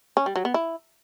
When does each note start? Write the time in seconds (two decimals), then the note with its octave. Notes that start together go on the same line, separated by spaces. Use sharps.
0.17 C#4
0.26 G3
0.36 F#3
0.45 B3
0.54 E4